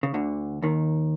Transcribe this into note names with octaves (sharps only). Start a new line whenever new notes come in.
C#3
D2 D3
D#2 D#3